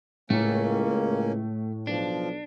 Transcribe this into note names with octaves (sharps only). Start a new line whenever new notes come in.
C#2 A2 A3 A#3 C#4
B1 F3 D4